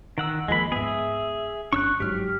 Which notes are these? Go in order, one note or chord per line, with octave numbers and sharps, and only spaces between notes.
D#3 F#5 E6
D#2 F3 G#3 A#3 B5
G#2 B3 G#4 E5
G1 C#4 D4 C#6 E6 F#6
G1 G#2 F#3 G4 F6